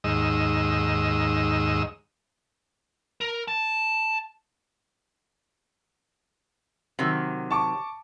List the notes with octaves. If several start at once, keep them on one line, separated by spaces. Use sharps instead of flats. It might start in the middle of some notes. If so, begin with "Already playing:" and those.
D#2 G#2 D#5 E6
A#4
A5
C3 D#3 F#3
A5 C#6 D6